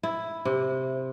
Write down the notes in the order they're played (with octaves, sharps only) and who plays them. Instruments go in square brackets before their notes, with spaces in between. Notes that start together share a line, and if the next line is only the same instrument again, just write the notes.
[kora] E4
C3